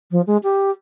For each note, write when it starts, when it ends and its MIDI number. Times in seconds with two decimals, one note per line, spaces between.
0.11 0.21 53
0.26 0.37 56
0.43 0.70 67